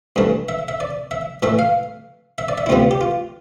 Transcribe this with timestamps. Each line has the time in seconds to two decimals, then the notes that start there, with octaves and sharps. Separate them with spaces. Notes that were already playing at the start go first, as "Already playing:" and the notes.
0.16 G2 E3 A3
0.49 E5
0.68 E5
0.80 D5
1.11 E5
1.43 A2 E3 A3 E5
1.59 F5
2.38 E5
2.48 D5
2.58 E5
2.66 E4
2.69 D2 C3 G3 B3 F4
2.91 G4
3.01 F4